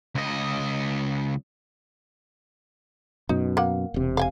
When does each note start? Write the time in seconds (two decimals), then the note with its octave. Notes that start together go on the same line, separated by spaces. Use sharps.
0.15 C#2 D#5
3.29 F#2 B2 D#4
3.57 A#3 F#5
3.94 E1 C3
4.17 F5 G5 G#5